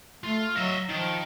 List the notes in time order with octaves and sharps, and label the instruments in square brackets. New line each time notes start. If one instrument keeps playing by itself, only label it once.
[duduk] A3 [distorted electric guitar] F4
[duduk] F#3 [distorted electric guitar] D#5 E5
[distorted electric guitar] D#3 [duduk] F3